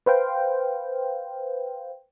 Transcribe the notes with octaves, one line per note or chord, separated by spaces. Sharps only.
B4 C5 F5 G5